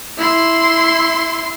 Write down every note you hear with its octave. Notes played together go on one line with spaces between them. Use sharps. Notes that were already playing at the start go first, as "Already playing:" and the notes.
E4 C6